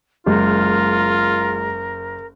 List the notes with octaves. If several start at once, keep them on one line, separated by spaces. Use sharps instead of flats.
F#1 G#3 F4 A#4